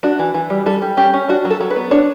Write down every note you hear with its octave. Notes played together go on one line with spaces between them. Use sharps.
D4 F#4
E3
E3
G3
G3 A4
G3
C#4 G4
C#4
D4 F#4
F#3
A4
F#3
B4
B3
D4 C#5